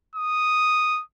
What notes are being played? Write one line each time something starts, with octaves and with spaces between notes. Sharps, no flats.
D#6